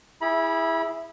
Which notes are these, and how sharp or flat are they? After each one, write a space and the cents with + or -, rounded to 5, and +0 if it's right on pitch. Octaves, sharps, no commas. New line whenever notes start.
E4 +0 G#4 -20 B5 -25